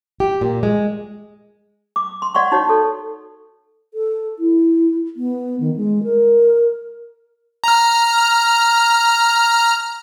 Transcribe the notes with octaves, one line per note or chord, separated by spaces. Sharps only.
G4
A#2
G#3
D6
C6
D5 F#5 C6 C#6
D#4 F#4 C#5
A4
A4
E4
B3
D#3
G#3
A#4
A#5 F6